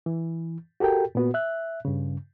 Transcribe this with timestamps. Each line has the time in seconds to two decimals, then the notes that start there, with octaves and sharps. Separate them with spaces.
0.06 E3
0.80 F#4 G4 A4 A#4 G5
1.15 A#2 B3 F#4
1.34 E5 F#6
1.85 G2 C#3